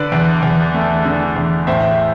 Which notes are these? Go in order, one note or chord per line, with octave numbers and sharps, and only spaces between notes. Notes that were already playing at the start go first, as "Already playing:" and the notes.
Already playing: D3 B4 D5
E2
E2
A3
D3
E2
A2 C5 E5